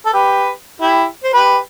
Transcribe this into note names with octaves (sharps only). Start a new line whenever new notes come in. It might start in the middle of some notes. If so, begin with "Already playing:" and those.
A4
G4 B4
E4 G4
C5
G4 B4